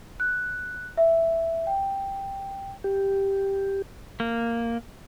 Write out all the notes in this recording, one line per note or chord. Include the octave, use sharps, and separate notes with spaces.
F#6
E5
G5
G4
A#3